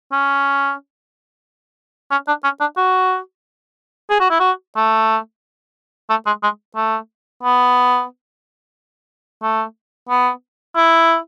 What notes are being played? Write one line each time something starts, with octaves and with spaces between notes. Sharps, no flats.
C#4
C#4
D4
C#4
D4
F#4
G#4
F#4
E4
F#4
A3
A3
G#3
G#3
A3
B3
A3
B3
E4